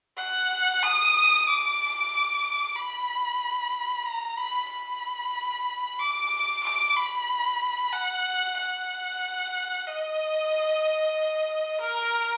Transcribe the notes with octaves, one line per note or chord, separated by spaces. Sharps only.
F#5
D#6
D6
B5
A#5
B5
B5
D6
D6
B5
F#5
F#5
D#5
A#4